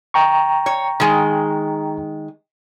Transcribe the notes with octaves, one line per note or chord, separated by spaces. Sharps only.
G5 A#5 C#6
C#5
D#3 G#3